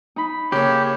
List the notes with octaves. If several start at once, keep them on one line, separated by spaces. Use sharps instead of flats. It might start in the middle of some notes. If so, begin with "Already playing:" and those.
D#4 B5
C#3 A#3 G4 C#5